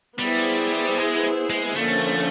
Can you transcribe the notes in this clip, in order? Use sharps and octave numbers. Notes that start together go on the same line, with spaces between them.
G3 B3 E4 G#4 C5
G#3
G#3
D3 F3 A3 A#3 C#4